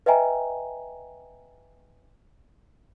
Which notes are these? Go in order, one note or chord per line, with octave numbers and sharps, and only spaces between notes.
B4 D#5 E5 G5 G#5 A#5